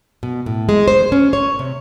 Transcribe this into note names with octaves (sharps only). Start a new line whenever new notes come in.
B2
A2
G#3
C5
C#4
C#5
C3